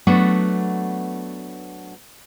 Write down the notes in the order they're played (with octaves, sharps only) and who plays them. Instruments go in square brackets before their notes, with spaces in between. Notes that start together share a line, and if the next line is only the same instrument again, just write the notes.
[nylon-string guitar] F#3 A3 B3 D4